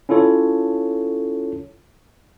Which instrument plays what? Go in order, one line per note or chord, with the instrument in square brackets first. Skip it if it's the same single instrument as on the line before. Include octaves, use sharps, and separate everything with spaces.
[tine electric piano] C#4 E4 F4 A4 C#5